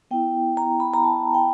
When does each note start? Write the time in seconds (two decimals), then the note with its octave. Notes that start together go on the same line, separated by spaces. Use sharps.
0.11 B3 E4 G5
0.57 A#5
0.80 B5
0.94 A#5
1.04 A5
1.34 G5